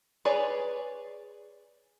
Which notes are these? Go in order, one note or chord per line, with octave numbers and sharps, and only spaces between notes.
G#4 B4 C#5 D5